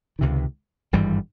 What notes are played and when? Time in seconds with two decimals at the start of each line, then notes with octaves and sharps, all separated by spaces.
0.19 C#2 C3 D#3
0.93 G#1 G2 E3 G3